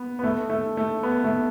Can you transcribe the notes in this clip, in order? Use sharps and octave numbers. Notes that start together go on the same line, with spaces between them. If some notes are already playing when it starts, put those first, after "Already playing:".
Already playing: B3
B3
A3
A3
A3
B3
A3